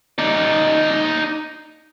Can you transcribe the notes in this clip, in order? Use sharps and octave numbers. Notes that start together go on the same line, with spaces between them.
D#4 D5